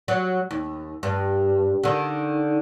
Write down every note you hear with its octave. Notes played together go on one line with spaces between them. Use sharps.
F#3
D#2
G2
D3 D#3